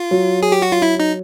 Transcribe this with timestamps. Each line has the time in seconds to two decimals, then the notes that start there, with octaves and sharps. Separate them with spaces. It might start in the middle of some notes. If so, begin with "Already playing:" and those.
Already playing: F4
0.11 F#3
0.43 G#4
0.52 G4
0.62 F#4
0.72 F4
0.82 E4
1.00 D#4